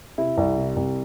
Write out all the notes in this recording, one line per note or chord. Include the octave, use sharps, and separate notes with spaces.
C3 E4
C2
C3
C2